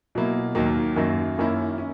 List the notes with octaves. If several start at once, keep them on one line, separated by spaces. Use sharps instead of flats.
B2 F#3 A#3 E4
D#2 D#3 F#3 A#3
F#2 D#3 F#3 A#3
F#2 D#3 A#3 C#4 E4
C#4